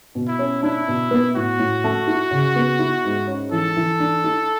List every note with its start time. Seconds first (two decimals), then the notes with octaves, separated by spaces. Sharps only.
0.15 B2
0.27 E4
0.39 C#4
0.63 D4 E4
0.88 B2
1.11 B3
1.35 A2 F#4
1.59 A2
1.84 A3
2.08 E4
2.31 C#3
2.56 B3
2.79 E4
3.04 G#2
3.27 C#4
3.52 E3 A4
3.77 E3
4.00 D4
4.24 E4